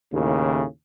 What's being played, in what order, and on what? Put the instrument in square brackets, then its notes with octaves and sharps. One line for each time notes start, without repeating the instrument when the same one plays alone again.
[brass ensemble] D#2 A2 C#3